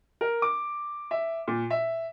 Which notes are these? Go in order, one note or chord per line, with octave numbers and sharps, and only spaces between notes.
A#4
D6
E5
A#2
E5